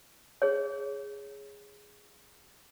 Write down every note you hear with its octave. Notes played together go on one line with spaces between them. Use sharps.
G#4 C#5